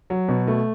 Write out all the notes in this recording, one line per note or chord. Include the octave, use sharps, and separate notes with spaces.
F#3
B2
A3